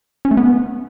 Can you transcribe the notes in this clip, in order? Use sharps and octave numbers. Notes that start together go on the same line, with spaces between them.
C#4
A3
B3